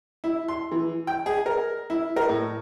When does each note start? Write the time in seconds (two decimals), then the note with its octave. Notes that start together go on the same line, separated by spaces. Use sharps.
0.24 E4
0.48 C6
0.71 E3
1.07 G5
1.26 G#4
1.46 A#4
1.90 E4
2.16 A#4
2.29 A2